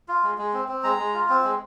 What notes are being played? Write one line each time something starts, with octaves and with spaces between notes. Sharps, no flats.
F4
G#3
G#3
C4
C4
G#3 A#5
G#3
F4
C4
G#3